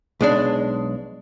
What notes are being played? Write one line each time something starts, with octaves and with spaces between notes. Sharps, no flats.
B1 G#3 D4